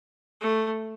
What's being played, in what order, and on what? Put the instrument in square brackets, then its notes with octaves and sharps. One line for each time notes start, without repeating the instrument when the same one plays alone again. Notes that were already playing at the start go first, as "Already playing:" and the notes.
[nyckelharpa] A3